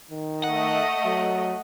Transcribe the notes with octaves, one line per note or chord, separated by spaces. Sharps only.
D#3
A3 D#5 F#5
F#3